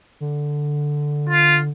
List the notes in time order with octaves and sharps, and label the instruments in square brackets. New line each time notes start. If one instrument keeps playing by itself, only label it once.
[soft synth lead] D3
[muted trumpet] F4